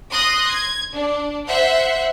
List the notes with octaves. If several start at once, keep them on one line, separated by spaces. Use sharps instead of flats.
C6 D#6 F#6 A#6
G#6
D4
C5 E5 F#5 C6